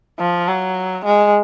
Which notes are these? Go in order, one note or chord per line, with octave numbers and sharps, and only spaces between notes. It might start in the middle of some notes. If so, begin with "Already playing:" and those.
F3
F#3
G#3